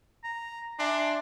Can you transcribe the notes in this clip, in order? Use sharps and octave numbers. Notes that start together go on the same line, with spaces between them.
A#5
D4 E5 G#5 C6